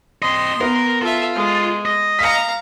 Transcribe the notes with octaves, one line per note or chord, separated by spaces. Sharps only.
C4 D#5 C6
B3 A#4
F4 A4 E5
G#3
D#5
F5 A#5 B6 C#7